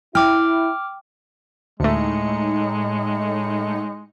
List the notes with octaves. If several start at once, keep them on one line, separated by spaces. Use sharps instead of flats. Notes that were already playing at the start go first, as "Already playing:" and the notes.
E4 G5 D6 F6
D2 A2 G#3 A3 D#4 C#7